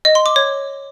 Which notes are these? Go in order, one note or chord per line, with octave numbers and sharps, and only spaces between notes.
D#5
C6
D6
C#5